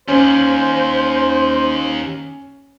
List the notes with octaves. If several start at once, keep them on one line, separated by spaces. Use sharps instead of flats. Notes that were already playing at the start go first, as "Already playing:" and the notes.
D#2 C#4 C5